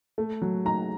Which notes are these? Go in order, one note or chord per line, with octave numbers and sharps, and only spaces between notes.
A3
F#3
D#4 A#5